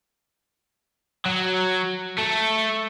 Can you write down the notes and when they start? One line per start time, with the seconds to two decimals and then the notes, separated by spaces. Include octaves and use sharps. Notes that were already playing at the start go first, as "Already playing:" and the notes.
1.26 F#3
2.18 A3